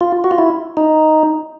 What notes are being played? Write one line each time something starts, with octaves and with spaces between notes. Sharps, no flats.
F4
F#4
F4
E4
D#4